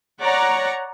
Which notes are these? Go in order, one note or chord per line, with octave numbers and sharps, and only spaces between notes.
C#5 D5 F#5 A#5